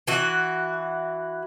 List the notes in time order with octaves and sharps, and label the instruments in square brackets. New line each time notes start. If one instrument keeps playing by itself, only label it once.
[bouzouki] E3 F#4